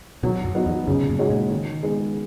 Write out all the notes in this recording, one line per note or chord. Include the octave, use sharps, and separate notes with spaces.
B2 D#3 F#3
F#2
B3 D#4 F#4
E2
F#2 C#3
B2
F#2 A#2
G#3 D#4 F#4 C#5
A#2 C#3
D#3
G#3 B3 D#4